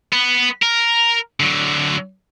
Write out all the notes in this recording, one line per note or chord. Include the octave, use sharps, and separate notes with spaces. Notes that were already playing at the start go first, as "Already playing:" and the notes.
B3
A#4
D3 F#3